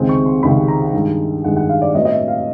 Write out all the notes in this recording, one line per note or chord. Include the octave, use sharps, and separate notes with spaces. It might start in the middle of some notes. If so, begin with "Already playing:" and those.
Already playing: C#2 C3 D#3 G#3 C4
C#6
C6
C#2 C3 D#3 G#3 C4 B5
A#5
G2 D#3 G#3
G2 D#3 G#3 F#5
F#5
F5
D5
A2 F#3 B3 D#5
D#5
E5
F5